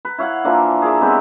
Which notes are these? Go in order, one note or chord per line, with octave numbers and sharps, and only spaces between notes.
B4
E4 C#5 F5 F#5
E3 F3 A#3 D4
G#4 A#4 D5 E5
G#3 B3 C4 G4